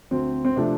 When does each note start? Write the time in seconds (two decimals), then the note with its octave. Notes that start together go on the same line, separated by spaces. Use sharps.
0.11 D2 C4
0.45 C4
0.56 C3 F3 A3 D4